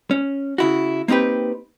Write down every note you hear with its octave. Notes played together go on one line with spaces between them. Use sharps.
C#4
C#3 E4 F#4
A#3 C4 D#4 G4 B4